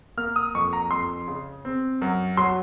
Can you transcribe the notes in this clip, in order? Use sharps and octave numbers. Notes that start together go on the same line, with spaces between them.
A#3 F6
D#6
F2 C#6
A#5
F2 C6
C#3
C4
F#2
F#3 C6